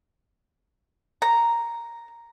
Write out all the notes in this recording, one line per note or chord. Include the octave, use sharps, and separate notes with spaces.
A#5